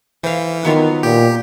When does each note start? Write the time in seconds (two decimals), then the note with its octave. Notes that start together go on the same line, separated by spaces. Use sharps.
0.23 E3 C5 F5
0.65 D#3 F#3 B3 F4
1.03 A#2 G4